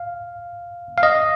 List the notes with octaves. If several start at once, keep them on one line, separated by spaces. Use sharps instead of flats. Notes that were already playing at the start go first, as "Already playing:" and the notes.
Already playing: F5
F5
D#5